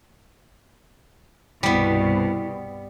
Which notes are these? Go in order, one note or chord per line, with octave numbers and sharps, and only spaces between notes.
C2 G2 B2 G3 B3 E4